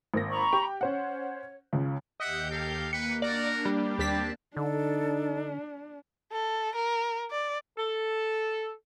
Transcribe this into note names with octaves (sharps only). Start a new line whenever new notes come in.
G#1 A#3 A#6
A#5 B5 C#6
G4 G5
C#4 C5 C#5 F#5
C#2 C#3
D#2 G4 D#5 E5 F#5 G6
A4 A#4 F5
A#3 B4 C#7
A#3 D4 F#4 A#4 D5
G3
D#2 C4 G4 A5 B6
D3 D4 D#4 A4
A4
A#4
D5
A4